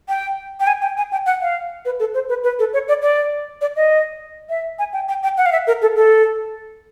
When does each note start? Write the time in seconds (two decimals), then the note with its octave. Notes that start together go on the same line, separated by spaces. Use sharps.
0.09 G5
0.60 G5
0.67 G#5
0.82 G5
0.97 G#5
1.12 G5
1.26 F#5
1.42 F5
1.85 B4
2.00 A4
2.14 C5
2.29 B4
2.44 B4
2.59 A4
2.73 C#5
2.88 D5
3.02 D5
3.61 D5
3.76 D#5
4.49 E5
4.79 G#5
4.93 G5
5.09 G5
5.23 G5
5.38 F#5
5.46 F5
5.52 E5
5.67 A#4
5.82 A4
5.96 A4